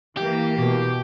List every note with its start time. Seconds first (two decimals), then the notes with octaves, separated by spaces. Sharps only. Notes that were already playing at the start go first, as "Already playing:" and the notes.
0.17 E3 A#3 G4
0.58 B2